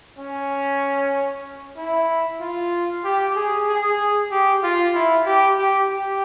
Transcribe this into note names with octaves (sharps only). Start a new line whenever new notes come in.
C#4
E4
F4
G4
G#4
G#4
G4
F4
E4
G4
G4
G4